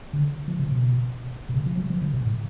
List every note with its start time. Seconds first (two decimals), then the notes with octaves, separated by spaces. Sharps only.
0.13 D3
0.48 F3
0.59 C#3
0.71 B2
1.49 B2
1.54 C#3
1.66 F3
1.77 F#3
1.90 F3
2.01 D3
2.13 B2
2.25 A2